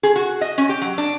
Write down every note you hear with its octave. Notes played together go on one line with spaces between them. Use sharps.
G#4
F#4
D#5
C#4
G4
F#3
D4